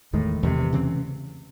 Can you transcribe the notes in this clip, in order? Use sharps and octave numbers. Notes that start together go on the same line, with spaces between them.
E2 A2 D#3 G#3
E2 C3 D#3 G#3
C#3 E3 C4